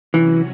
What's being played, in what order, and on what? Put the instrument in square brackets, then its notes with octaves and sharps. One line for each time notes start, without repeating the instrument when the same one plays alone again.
[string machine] C3 F#3 C#4 F#4 [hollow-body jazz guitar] E3